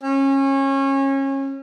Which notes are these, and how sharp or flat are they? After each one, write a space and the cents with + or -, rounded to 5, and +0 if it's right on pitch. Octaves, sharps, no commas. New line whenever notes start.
C#4 -25